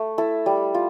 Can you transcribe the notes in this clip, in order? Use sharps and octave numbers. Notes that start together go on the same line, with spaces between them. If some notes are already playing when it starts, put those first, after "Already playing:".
Already playing: A3
E4 A4
G3
F4